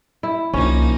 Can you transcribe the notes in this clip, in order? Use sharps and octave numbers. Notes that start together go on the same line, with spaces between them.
E4
C2 F3 A#3 C#4 D#4